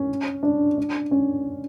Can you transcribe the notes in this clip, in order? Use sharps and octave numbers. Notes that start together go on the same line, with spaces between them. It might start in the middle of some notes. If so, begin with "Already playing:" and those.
Already playing: C#4
D4
D4
C#4